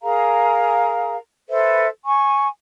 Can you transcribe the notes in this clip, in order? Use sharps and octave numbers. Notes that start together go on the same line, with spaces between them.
G#4 A#4 F5 A#5
A4 B4 C5 E5
G#5 C#6